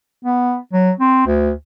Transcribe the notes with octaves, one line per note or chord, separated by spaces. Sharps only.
B3
F#3
C4
D2